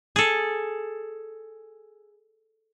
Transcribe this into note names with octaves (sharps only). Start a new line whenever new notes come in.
G#4 A4